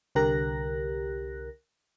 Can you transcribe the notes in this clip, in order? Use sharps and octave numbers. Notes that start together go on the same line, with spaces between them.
C2 D3 G4 A#4 F#6 A#6